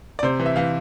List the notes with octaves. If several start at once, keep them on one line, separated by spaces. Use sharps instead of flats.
D5
C3 C5
E3
E5
E3 F5